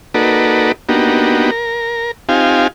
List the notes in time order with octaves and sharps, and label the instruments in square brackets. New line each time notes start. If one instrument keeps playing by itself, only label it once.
[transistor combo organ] A#3 D#4 F#4 A4 B4 D5
A#3 B3 D4 D#4 F#4 G4
A#4
C4 D#4 F4 G4 F5 G#5